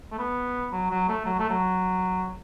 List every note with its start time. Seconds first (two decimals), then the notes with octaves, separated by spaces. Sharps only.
0.12 A3
0.19 B3
0.72 F#3
0.91 F#3
1.09 A3
1.26 F#3
1.39 A3
1.50 F#3